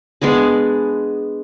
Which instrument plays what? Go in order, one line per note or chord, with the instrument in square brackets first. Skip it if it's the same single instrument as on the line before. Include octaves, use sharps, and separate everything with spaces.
[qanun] G#3 B3 D4 G#4